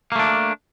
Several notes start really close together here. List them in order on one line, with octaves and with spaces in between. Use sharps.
A#3 A3 D4